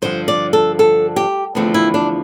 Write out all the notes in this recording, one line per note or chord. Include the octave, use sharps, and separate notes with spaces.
G2 D3 F3 C5
D5
A4
A4
G4
E2 D3 F3 A3 C4
E4
D4